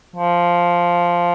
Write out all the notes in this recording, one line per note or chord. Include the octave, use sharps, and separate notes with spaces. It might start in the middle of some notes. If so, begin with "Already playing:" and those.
F3